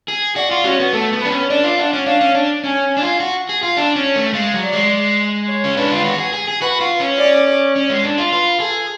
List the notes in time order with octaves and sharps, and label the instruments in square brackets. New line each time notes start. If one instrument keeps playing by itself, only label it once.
[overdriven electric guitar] G#4
[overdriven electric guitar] F#4 [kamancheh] D5
[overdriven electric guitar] F4
[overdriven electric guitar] C#4 [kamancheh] F#4
[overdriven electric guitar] B3
[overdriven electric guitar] A3 [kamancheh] A4
[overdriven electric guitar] B3
[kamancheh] B4
[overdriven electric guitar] D4
C#4
[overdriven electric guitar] D4 [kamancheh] D5
[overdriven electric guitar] F4
[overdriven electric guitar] D4 [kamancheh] F#5
[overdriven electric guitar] C#4
[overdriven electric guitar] D4 [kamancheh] F5
[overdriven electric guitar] C#4
D4
[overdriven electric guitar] C#4 [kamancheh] G#5
[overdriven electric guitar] D4
F4
F#4
G#4
F4
[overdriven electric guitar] D4 [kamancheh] A5
[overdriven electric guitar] C#4
A3
[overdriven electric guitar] G#3 [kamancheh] F5
[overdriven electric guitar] F#3
[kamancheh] D5
[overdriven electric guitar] G#3
[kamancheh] C#5
[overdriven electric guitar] C#4
[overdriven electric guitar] D4 [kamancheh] B4
[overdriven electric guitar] F4
F#4
G#4
G#4
G#4
[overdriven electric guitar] F#4 [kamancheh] B4
[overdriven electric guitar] F4
C#4
[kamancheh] D5
[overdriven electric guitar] C#4
G#3
D4
F4
[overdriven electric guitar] F4 [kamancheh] B4
[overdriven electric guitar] G#4 [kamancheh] A4